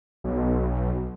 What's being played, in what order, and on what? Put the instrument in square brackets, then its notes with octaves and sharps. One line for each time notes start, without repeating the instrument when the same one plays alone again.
[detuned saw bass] B1